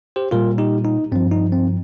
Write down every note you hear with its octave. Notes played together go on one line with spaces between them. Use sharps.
G4 C5
A#2 G3 F4 A#4
D#4 G4
D#4
G2 F3 C4
D#4
C4